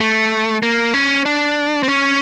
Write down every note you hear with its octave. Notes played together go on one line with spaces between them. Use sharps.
A3
A#3
C#4
D4
C4
C#4